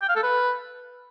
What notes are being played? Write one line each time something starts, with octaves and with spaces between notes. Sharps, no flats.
G5
F5
A4
B4